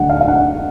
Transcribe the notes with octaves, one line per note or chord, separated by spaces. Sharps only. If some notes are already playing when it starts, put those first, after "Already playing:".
Already playing: D2 D3 F#3 F#5
F5
F5
F#5